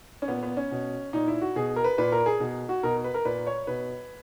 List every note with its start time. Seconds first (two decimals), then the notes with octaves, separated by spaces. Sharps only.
0.22 C#4
0.28 A#2 B3
0.43 B3
0.57 C#4
0.71 B2
1.13 A#2 D#4
1.28 E4
1.41 F#4
1.56 B2 G#4
1.76 A#4
1.84 B4
1.98 A#2 B4
2.12 A#4
2.26 G#4
2.40 B2
2.69 F#4
2.83 B2 A#4
3.04 B4
3.14 A#4
3.25 A#2 B4
3.47 C#5
3.67 B2 B4